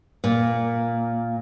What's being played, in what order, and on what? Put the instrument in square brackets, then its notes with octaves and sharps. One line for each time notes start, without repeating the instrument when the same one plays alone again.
[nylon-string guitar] A#2